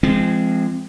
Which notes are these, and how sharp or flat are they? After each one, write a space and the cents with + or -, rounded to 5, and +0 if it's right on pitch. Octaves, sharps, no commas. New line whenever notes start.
F3 -35 G#3 +0 C4 +0